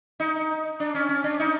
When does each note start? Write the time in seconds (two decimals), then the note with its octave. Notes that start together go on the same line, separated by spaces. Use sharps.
0.20 D#4
0.80 D4
0.94 C#4
1.09 C#4
1.24 D4
1.39 D#4